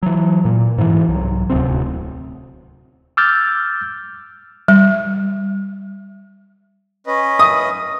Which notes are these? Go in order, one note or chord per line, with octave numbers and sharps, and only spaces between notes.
E3 F#3
A#2
G#2 E3
C2 F#3
D1 D2 C3 C4
D6 E6 F6 G6 A6
G3
C#4 B4 D#5
D#6